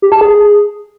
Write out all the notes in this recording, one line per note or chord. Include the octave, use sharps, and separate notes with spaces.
G4
A5
G#4